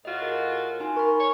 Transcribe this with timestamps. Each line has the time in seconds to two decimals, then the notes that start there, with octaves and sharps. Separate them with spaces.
0.05 A2 F4 F#4 D#5
0.22 G#4 A#4
0.80 D#4 G#5 C6
0.96 A#4 B5 C#6
1.19 C#5